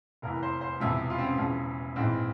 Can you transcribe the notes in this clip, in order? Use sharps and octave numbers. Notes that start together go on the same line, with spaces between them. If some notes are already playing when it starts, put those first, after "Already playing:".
F1 E2 E3 A#4
C5
C5
E1 E2 C3 F3 E5
F4
C4
C#4
E1 E2 C#3 F3
A#1 G#2 E3 C4